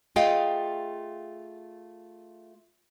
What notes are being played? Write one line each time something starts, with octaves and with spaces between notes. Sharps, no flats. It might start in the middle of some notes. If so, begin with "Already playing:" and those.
A3 F4 G#4 D#5 F5 G5